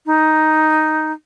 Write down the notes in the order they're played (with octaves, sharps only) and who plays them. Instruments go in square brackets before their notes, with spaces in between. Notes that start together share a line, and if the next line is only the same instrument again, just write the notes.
[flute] D#4